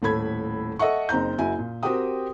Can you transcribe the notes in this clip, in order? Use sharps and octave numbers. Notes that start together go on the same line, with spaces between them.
D#1 A2 A4 B5 G#6
A4 D#5 E5 F#5 C#6
F#1 C4 D#4 A#5 G6
F#1 E4 F#4 G#5
A#2
C4 F#4 G4 A#4 G5 D#6